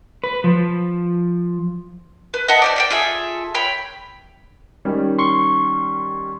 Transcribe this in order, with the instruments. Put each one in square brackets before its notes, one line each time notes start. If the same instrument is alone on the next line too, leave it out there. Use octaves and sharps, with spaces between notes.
[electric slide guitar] B4
F3
[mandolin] B4
D#5 E5 F#5 A5
G4 C5 D5
D5 F5 G5
F4 G#4 A4 E5
C#5 G5 B5
[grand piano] D#3 G3 C#4
[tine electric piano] C6 C#6